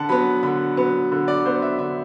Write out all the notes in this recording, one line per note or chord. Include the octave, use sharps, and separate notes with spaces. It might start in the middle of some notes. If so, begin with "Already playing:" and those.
Already playing: D3 F#5 A5
F#3 B3 B5
D3 B5
F#3 B3
D3
D5
F#3 B3 C5
E5
D3 E5